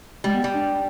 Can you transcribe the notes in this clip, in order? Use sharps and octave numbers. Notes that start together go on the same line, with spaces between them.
G3 G#3
B3
G3
D4